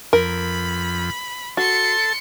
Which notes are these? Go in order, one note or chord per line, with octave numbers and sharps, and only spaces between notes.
F2 A#4 B5
F#4 A4 A5 C6 C#7